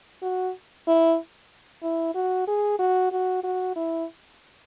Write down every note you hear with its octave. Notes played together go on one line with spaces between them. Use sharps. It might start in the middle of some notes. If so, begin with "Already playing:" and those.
F#4
E4
E4
F#4
G#4
F#4
F#4
F#4
E4